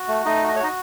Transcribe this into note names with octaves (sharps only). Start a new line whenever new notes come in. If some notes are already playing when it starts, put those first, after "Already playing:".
Already playing: F#4
A3
A3 D#4 D#5
F#4 D#5
C#5
D#4 F#4 D#5